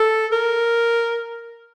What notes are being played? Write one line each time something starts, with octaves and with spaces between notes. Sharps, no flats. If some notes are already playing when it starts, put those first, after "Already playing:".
Already playing: A4
A#4